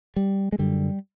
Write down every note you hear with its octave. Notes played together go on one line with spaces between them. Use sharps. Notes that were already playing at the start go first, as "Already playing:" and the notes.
G3
G#3
F#2 D3 G3